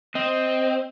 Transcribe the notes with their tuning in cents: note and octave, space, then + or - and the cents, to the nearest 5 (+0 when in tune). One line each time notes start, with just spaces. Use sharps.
C4 +0 D#5 +5